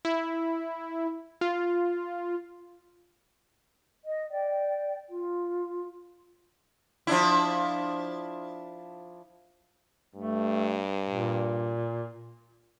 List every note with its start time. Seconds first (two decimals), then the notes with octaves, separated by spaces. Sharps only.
0.05 E4
1.41 F4
4.05 D#5
4.30 D5 G5
5.09 F4
7.07 F3 D4 E4
10.15 G2 A3
11.09 A#2